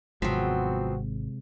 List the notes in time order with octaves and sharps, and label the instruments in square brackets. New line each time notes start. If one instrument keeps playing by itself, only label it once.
[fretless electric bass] G#1 [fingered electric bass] C3 G#3 [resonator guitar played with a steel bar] F3 F#3 [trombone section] B3 C4 F#4